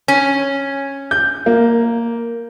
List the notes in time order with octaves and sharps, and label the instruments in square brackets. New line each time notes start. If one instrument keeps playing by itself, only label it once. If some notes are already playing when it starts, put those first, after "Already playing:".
[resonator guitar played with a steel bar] C#4
[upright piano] G6
A#3